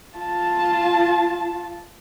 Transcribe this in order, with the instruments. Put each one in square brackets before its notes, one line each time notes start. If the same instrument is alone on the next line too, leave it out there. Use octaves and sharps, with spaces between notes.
[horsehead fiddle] F4 A5